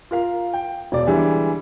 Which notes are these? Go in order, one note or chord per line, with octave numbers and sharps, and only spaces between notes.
F4 A#4 F5
G5
E1 D5
D3 E3 G3 G#3